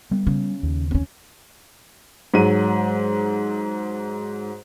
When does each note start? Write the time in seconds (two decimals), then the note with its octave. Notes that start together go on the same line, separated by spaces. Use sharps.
0.11 G3 B3
0.27 C#3
0.63 D#2
0.91 C4 C#4
2.34 G#2 F#3 D#7